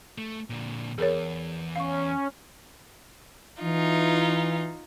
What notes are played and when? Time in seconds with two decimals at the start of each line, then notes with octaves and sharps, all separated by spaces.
0.18 A3
0.50 A#2 D3
0.98 E2 G#4 A#4 C#5
1.76 C#4 F5 C#6
3.62 E3 D#4 F4